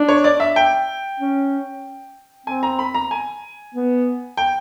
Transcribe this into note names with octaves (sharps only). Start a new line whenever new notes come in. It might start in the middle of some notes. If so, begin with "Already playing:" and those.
Already playing: D4
C#5
D5
E5
G5
C#4
C4 G#5
A#5
B5
A#5
G#5
B3
G5